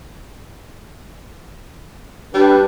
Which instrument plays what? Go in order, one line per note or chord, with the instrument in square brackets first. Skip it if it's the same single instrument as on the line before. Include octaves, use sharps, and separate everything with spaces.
[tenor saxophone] G3 [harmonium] D4 B4